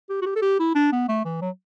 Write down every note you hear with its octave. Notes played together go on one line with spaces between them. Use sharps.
G4
F#4
G4
A4
G4
E4
D4
B3
A3
E3
F#3